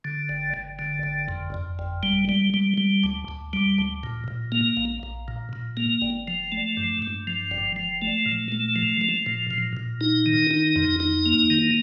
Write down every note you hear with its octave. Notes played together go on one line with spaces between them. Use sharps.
D3
G1
G1
D3
G1
F2
F2
G1
G3
G3
G3
G3
D2
D2
G3
D2
A#2
A#2
A#3
A#1
A#1
A#2
A#2
A#3
G1
F3
A3
G2
G2
F3
G1
F3
A3
A#2
A3
F3
F3
A#2
A#2
A#2
D#4
D#3
D#4
F2
D#4
A#3
D#3